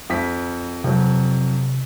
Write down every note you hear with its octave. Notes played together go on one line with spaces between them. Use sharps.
F2 B6
F2 C3 F3 F#3